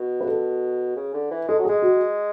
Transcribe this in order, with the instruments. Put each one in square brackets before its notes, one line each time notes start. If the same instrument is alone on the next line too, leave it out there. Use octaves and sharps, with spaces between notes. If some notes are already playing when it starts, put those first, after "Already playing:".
Already playing: [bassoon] B2
[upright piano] B4
A4
[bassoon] C#3
D3
E3
[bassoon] G#3 [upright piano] A4
[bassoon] F#3
[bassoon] G#3 [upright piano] G#4
[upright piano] F#4